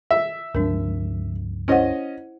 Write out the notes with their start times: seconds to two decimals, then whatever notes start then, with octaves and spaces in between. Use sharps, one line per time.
0.11 E5
0.55 C#2 G2 F3 D4 A#4
1.68 C#4 E4 C5 D#5 F#5